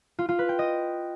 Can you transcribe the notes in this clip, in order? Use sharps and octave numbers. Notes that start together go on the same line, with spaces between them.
F4
F4
B4
G5
D#5